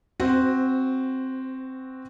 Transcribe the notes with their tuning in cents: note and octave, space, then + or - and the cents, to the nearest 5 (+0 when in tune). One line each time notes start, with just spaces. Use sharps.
C4 +0 F#4 +0 C5 -25